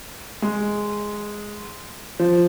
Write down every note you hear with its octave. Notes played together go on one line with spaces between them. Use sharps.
G#3
F3